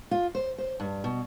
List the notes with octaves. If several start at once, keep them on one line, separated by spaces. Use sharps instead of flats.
F4
C5
C5
G2
B2